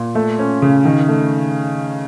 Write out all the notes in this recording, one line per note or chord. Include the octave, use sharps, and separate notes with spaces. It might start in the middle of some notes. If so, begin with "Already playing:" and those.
Already playing: A#2
A3
C#4
C#3
D#3
A3